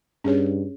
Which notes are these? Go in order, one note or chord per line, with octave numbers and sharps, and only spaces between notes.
G2 C#4 G#4 C#5